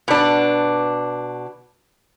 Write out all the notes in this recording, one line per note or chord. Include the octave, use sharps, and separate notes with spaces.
B2 D4